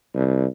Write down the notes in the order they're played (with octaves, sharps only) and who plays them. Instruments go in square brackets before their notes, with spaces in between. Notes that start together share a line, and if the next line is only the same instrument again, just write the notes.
[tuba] C2